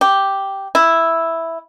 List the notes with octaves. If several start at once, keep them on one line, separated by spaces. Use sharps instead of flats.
G4
E4